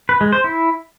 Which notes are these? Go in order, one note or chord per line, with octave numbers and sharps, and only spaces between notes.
B4
G#3
C5
E4